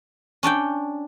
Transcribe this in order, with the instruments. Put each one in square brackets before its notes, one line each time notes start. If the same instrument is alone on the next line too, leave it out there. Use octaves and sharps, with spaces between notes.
[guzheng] C#4 D4 D5 G5